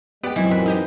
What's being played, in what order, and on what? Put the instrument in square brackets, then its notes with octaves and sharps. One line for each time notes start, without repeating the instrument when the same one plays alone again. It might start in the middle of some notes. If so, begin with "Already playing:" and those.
[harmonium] G#3 [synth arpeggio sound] B3 D5 [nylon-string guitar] G4 G5
[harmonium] F#2 C4 [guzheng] E3 [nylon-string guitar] F#3 G#3 E4
[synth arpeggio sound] A#2 [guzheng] B4
[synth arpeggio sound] D#4 G4 D#5